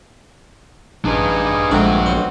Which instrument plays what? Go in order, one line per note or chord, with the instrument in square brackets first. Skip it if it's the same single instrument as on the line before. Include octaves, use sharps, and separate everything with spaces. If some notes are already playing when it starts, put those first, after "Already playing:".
[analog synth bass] A1 [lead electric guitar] D4 B4 [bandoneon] D#4 G#4
[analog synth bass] A#1 [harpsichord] G#2 A3 F5 [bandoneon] C4 F#4 [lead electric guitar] D4 G5
[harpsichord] B1 C5